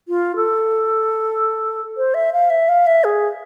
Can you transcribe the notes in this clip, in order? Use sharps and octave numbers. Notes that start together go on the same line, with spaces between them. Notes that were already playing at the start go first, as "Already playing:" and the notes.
F4
A4
C5
E5
F5
E5
F5
E5
G#4